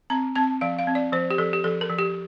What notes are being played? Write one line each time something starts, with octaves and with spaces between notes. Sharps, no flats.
C4 A#5
C4 A5
F3 F5
F5
C4
D5
F3 C5
G4
F3 A4
G4
F3 A4
A#4
F3
G4